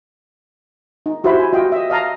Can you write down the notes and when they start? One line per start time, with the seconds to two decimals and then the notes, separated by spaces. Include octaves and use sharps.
1.06 D#4
1.24 E4 F#4 G4 C5 E5 B5
1.39 G#5
1.53 F4 F#4 D#5 G5
1.72 D#5 E5
1.90 D#5 F5 A5 A#5